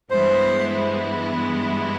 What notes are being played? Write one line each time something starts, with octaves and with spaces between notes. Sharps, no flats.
G2 E3 G#3 B3 E4 C5